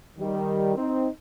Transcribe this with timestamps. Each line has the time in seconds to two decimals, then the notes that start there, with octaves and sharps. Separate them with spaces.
0.19 D#3 G3
0.77 C4 D#4